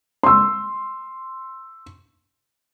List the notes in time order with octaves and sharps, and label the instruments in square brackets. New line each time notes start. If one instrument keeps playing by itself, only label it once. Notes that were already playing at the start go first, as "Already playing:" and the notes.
[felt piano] C6 E6